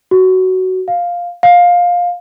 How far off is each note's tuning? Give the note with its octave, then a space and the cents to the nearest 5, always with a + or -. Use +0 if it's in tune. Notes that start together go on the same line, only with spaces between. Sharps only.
F#4 +10
F5 +5
F5 +15